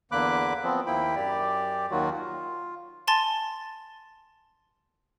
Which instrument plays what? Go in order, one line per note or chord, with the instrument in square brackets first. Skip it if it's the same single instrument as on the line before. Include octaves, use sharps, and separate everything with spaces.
[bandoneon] E2 D3 A#3 B5 D6 F#6
F3 B3 C4
D#2 A#3 E4 G5 B5
F#2 G4 D5
D#2 D#3 F#3 F4 F#4
F4
[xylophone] G#5 A5 C6 A6